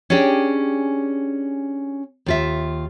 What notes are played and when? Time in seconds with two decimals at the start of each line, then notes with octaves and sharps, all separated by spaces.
0.10 C#4 D4 G4 G#4 G5
2.26 D#2 F4 E5